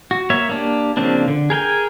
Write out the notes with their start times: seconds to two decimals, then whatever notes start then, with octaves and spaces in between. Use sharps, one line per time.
0.11 F#4
0.30 A#3 C#5 E5
0.49 A#3 D4 G4
0.97 C#3 F3 A#3 C4 D4
1.28 D3
1.50 G#4 A#4 G5 G#5